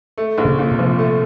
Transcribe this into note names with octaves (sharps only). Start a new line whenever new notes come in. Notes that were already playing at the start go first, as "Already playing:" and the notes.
A3
A#1
C#3
A#2
C3
F3
A3